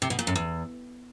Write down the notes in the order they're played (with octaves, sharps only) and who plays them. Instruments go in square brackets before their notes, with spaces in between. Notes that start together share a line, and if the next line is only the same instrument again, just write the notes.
[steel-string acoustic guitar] C3
B2
A#2
F#2
E2